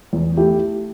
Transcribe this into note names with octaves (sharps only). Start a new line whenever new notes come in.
E2
A3 E4 G4